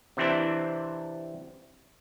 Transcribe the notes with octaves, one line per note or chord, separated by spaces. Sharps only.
C3 E3 C4 D4 E4